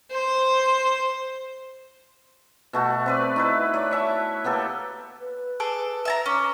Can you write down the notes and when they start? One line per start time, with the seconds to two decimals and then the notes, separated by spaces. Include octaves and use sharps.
0.12 C5
2.73 B2 A3 F#4
3.06 C4 B4 D5
3.36 D#4 E4 B4
3.74 C#5 D5
3.91 C#5 E5 A5
4.44 A#3 B3 G4 A4
5.20 B4
5.60 G#4 A4 D6
6.05 E5 A5 A#5
6.26 C#4 D6